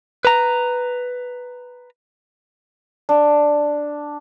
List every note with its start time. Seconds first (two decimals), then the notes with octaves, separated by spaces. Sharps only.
0.25 B4 A#5
3.09 D4